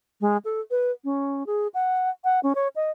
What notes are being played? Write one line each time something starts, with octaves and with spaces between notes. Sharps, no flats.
G#3
A4
B4
C#4
G#4
F#5
F#5
C#4
C#5
D#5